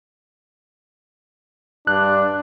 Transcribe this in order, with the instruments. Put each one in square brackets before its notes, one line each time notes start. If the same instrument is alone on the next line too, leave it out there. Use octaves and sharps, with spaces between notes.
[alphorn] G2 [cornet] D4 [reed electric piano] F#6